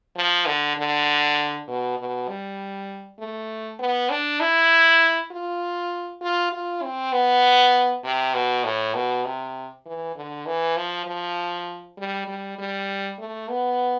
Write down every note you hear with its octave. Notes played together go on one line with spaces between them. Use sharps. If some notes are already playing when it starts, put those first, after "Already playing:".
F3
D3
D3
B2
B2
G3
A3
B3
D4
E4
F4
F4
F4
C4
B3
C3
B2
A2
B2
C3
E3
D3
E3
F3
F3
G3
G3
G3
A3
B3